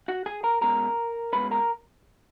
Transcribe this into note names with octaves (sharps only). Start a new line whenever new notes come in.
F#4 F#5
G#4 G#5
A#4 A#5
B2 G#3 C#4 A#4 A#5
B2 G#3 C#4 B4 B5
A#4 A#5